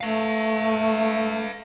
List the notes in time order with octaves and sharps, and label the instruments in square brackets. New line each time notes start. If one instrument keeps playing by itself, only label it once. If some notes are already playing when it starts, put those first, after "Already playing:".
[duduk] A3 [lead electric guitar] B4 F5